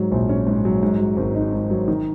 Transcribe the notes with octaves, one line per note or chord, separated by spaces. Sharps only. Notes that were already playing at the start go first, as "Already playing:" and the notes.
Already playing: G#2 F#3
A#1
C#4
G#2
F#3
G#2
F#3
G#1
D#4
G#2
F#3
D#3